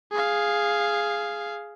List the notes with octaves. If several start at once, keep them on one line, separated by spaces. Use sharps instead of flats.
G#4 F5